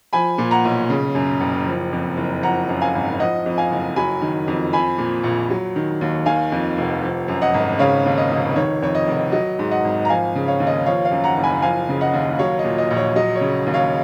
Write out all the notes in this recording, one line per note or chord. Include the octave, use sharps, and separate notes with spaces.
F3 G#5 B5
A#2
F#5 A#5
B1
C#3
F#2
F#1
F3
F2
F#1
F3 F#5 A#5
F#2
F5 G#5
G#1
F3 D#5 F#5
F2
F5 G#5
F#1
F#3 G#5 B5
D#3
F2
F3 G#5 B5
A#2
A#1
F#3
D#3
D#2
D#3 F5 G#5
F2
F1
F3
F#2
D#5 F#5
G#1
C#3 C#5 F5
D#2
D#5
F1
D#3 C#5
F2 C#5
D#5
F1
F#3 D#5
G#2
D#5 F#5
G#1
A#5
F3 F5 G#5
C#3
C#5 F5
D#2
D#5
F3 C#5 F5
C#5 F5
F#2
F#5 A#5
F#1
G#5 B5
F3 F5 G#5
C#3
D#5 F#5
D#2
F#3 C#5 F5
D#5
A#2
D#5
A#1
C#5
F#3 D#5
C#5
C#3
D#2
C#5 F5